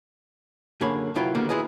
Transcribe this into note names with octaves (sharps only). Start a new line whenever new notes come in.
F#2 D3 A#3 G#4 C#5 B5
C2 F#3 E4 F4 B4 G5
D3 D#3 G3 A#3 B3
E4 F4 G#4 B4 D#5